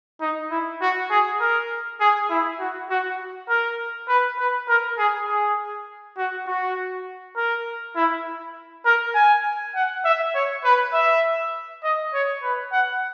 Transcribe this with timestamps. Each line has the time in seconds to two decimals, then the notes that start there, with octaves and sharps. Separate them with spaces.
0.21 D#4
0.51 E4
0.81 F#4
1.11 G#4
1.40 A#4
2.01 G#4
2.30 E4
2.60 F#4
2.90 F#4
3.49 A#4
4.08 B4
4.38 B4
4.69 A#4
4.98 G#4
5.28 G#4
6.17 F#4
6.47 F#4
7.37 A#4
7.96 E4
8.86 A#4
9.15 G#5
9.75 F#5
10.05 E5
10.35 C#5
10.65 B4
10.94 E5
11.84 D#5
12.14 C#5
12.43 B4
12.72 F#5